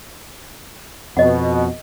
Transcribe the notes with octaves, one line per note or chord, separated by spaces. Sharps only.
F2 B2 D#5 F#5